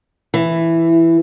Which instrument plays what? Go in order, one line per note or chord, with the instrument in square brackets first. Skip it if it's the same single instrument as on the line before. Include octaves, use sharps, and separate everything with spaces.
[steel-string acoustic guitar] E3